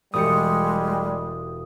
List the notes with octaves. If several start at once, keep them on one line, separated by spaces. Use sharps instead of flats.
E1 G3 G#3 G4 D#6 C#7